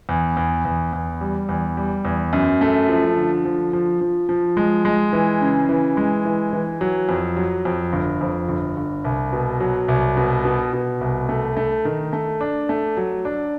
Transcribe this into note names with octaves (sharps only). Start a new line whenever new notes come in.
E2
E2
E2
E2
G3
E2
G3
E2
F#2
A3
F3
D3
F3
F3
F3
F3
G#3
G#3
E3
C#3
E3
G#3
E3
E3
F#3
F2
F#3
F2
G1
F2
G1
G1
C2
B2
F#3
C2
B2
B2
B2
C2
A3
A3
D#3
A3
D4
A3
F#3
D4